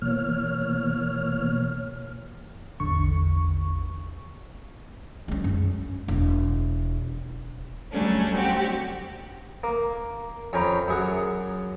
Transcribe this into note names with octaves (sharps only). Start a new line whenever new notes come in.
B2 E3 A#3 C#5 F6
A1 E2 D3 C#6
G#3 C#4
F#2 C#4
E1
D2 F#3 G3 A3 C#4 D4
C4 F#4 G4
A#3
F2 C#4 G5 A#5 B5
F#2 G#4 F#5